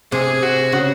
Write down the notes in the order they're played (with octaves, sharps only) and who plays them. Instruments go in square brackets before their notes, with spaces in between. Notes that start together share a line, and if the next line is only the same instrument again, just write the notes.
[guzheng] C3 [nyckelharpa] G#4
[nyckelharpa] F#4
[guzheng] C#3